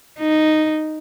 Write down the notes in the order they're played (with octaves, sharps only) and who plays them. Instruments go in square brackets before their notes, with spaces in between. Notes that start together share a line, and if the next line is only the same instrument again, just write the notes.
[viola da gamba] D#4